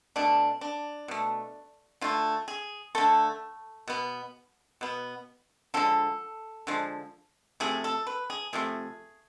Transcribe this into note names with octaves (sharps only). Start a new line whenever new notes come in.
B2 A3 D4
D4
B2 A3
D3 A3 F4
G#4
D3 A3 A4
B2 B3
B2 B3
D3 F3 G#3 A4
D3 F3 G#3
C3 F3 A3 G#4
A4
B4
G#4
C3 F3 A3 G#4